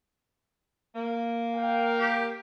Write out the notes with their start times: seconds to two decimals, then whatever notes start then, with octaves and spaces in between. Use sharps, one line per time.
0.95 A#3
1.55 A#4 F5 G5
1.99 G4